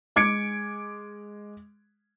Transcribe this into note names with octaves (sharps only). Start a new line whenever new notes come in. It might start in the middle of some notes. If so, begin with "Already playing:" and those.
G#3 D6 G#6 C#7 D7